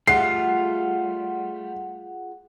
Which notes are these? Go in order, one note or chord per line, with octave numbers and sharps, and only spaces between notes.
G3 A3 F4 G#4 F#5 C7